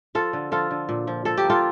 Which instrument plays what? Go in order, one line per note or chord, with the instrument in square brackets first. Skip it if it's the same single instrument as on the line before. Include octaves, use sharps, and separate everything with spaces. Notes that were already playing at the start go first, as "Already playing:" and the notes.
[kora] F3 F4 A4
D3
F3 F4 A4
D3
A#2
F3
F3 A4
G4
A#3
F4 A4